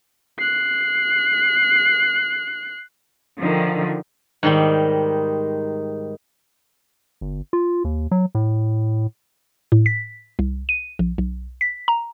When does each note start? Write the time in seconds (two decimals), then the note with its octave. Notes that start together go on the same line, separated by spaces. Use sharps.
0.39 F#6 C7
3.41 D3 D#3 F3
4.43 G#2 D#3 G3
7.21 G1
7.53 F4
7.84 D#2
8.11 F#3
8.35 A2
9.72 A2
9.86 B6
10.39 C2
10.69 D#7
10.99 A#1
11.18 B1
11.61 B6
11.88 A#5